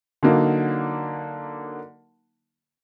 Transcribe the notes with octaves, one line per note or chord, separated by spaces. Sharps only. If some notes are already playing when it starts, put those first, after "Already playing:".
D3 F#3 A#3 D#4